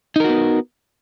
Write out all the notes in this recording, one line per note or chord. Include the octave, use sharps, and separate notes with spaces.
B3 D#4 F#4 A#4